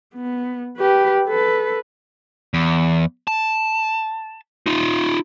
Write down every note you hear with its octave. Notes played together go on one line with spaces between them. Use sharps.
B3
G4 B4
A4 B4
E2
A5
D#4 F4